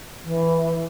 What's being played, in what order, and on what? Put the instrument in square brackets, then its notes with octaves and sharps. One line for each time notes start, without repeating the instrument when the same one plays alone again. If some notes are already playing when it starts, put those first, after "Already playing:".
[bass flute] E3